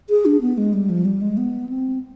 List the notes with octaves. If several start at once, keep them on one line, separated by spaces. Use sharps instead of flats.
G#4
D4
B3
G#3
G3
F3
G3
G#3
B3
C4